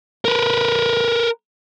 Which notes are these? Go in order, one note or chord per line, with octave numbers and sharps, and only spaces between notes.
A#4 B4